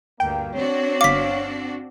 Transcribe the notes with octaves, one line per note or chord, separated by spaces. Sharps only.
D2 G2 A#3 G5
C4 D4 F#4 C#5
G1 F5 D6 B6